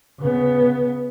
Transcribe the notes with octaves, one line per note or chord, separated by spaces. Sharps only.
C#3 B3